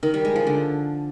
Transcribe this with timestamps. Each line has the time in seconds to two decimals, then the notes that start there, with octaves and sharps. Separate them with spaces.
0.03 D#3
0.14 G3
0.25 G#3
0.36 F3
0.47 D3